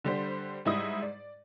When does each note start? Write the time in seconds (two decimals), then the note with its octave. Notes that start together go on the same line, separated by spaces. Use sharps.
0.04 D3 G3 C5
0.65 G#2 G3 E4 D#5 D#6
1.02 D5